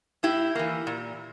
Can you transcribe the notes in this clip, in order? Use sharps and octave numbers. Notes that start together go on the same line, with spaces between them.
A2 E4 G4
E3 A#3
A#2